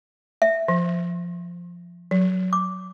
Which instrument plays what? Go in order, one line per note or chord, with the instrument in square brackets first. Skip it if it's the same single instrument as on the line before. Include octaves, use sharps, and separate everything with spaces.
[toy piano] E5
[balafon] F3
F#3
[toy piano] D6